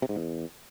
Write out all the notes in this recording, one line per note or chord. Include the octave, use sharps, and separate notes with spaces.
C3
G#2
E2